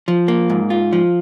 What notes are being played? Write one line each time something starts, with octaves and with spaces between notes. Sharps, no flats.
F3
A#3
G#2
F4
F3